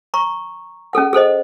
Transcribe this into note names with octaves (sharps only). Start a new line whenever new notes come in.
A#5 C#6
C#4 G#4 A4 F#5
G#4 A4 C5 D#5